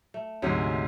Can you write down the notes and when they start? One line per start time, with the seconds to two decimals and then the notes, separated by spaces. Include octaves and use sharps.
0.14 A3
0.42 D2 G#2 C3 F#3 G#4